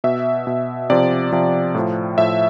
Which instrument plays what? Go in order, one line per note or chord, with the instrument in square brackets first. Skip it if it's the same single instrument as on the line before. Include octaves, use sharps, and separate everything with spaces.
[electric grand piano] B2 E5
B2
C3 F3 D5
C3 F3
A2 F3
A2 F3 E5